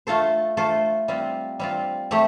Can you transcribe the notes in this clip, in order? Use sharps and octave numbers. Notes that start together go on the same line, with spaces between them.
A3 F4 A4 C5
A3 F4 A4 C5
G3 C4 F4
G3 C4 F4
A3 C4 G4